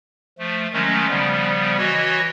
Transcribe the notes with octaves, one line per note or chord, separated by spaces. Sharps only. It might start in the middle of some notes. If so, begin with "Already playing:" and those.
F3 A3
D#3 F#3 G#3 A3 C#4
C#3 F3 G3 B3
E3 F#4 C#5 D#5